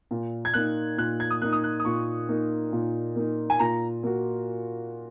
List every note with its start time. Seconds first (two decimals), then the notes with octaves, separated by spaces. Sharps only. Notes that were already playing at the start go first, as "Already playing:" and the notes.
0.11 A#2
0.45 G#6
0.54 A#3 D#4 F#6
0.98 A#2 F#6
1.20 G#6
1.31 D#6
1.42 A#3 F#6
1.44 D#4
1.53 D#6
1.64 F#6
1.80 D#6
1.85 A#2 C#6
2.29 A#3 D#4
2.73 A#2
3.16 A#3 D#4
3.50 G#5
3.59 A#2 A#5
4.03 A#3 F#4